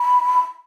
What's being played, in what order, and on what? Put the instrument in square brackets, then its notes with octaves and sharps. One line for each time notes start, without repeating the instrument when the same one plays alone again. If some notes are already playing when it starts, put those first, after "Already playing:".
Already playing: [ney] B5